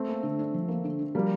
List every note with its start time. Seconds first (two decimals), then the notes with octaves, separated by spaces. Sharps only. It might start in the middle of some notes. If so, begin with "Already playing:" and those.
Already playing: A3 C4
0.08 A#3
0.23 D3
0.39 D4
0.54 F3
0.68 A#3
0.84 D3
0.99 D4
1.15 F3 G3 A#3